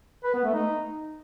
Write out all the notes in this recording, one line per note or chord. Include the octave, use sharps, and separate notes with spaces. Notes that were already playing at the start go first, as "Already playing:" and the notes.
B4
B3
A3
D#4